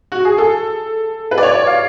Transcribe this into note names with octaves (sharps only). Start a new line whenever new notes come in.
F#4
G#4
A4
B4
D5
C#5
C#5
F5